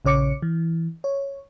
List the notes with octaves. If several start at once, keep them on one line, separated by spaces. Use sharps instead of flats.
A#1 C#3 C#5 D6 C#7
E3
C#5